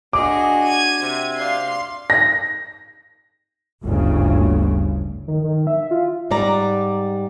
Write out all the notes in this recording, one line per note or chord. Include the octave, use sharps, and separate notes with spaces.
D4 F#4 G#4 D#5 D6
G#6 D#7
C3
D5 F5 C6
A#6
G1 D2 C#3
D#3
D#3
E5
F4
G#2 G3 D5 A#5